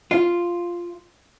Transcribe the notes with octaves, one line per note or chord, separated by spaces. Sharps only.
F4